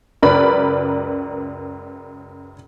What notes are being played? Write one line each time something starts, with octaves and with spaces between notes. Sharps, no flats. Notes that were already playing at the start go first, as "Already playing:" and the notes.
C#2 F#2 A#4 B4 D5 B5